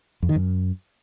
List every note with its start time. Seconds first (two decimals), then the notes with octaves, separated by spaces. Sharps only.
0.23 F2
0.29 D#3
0.36 F#2